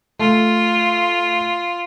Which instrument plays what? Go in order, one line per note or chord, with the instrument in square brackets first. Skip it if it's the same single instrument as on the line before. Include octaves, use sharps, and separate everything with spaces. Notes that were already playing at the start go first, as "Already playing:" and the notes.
[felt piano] A3 [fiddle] F4